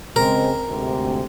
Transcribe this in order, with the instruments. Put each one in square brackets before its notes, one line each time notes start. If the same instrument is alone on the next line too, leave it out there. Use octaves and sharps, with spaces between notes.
[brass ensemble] C#3 G#3 C4 [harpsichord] A#4
[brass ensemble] D2 G#2 C3